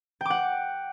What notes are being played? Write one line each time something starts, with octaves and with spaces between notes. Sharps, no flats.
F#5 G5 D6